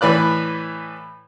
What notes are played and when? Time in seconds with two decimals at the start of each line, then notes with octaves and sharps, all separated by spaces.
0.01 A2 E3 B4 D5 F#6